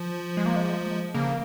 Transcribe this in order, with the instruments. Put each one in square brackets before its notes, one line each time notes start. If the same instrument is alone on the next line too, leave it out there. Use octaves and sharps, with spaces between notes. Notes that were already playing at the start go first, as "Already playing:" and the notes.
Already playing: [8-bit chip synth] F3
[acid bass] G#3
A#3
G#3
[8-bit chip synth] C#3 [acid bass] A#3